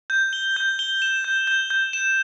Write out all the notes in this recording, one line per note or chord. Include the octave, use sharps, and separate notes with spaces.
G6
G7
G6
G7
E7
G6
G6
G6
E7